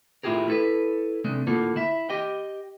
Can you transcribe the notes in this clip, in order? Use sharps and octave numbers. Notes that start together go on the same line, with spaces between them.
A2 E4 F4 G4 G#4 A#4
E4 A4 B4
C3 G#3 A3 D4
A2 D3 A#3 F4 A4
E4 E5
G4 D#5 G5